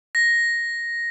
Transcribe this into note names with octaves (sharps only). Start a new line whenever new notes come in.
A#6